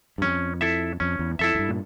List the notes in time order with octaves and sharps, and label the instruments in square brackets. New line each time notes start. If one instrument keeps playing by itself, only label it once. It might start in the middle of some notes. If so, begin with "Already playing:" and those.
[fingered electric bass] G2
[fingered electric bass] F2 [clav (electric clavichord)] C#4
[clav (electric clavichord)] E4 A4 E5
[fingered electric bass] F2 [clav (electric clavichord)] C#4
[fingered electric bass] E2
[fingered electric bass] F2 [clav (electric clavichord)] E4 A4 E5
[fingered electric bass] F2
G2
A#2